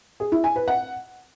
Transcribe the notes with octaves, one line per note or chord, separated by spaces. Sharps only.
G#4
E4
G#5
B4
F#5